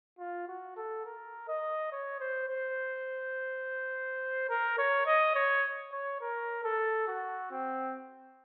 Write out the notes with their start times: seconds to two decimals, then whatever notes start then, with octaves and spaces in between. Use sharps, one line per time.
0.19 F4
0.48 F#4
0.77 A4
1.05 A#4
1.48 D#5
1.92 C#5
2.20 C5
2.49 C5
4.50 A#4
4.78 C#5
5.06 D#5
5.35 C#5
5.92 C#5
6.21 A#4
6.64 A4
7.07 F#4
7.51 C4